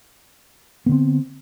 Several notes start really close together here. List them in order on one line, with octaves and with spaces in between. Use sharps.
B3 D3 C4